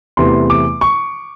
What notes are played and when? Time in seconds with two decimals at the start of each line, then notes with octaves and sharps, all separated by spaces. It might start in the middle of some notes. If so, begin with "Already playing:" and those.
0.17 E2 C3 E3 A3 C6
0.50 D6
0.81 C#6